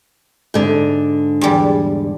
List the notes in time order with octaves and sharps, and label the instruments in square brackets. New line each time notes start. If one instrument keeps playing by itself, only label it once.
[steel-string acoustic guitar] G#2 D3
[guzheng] E2 G3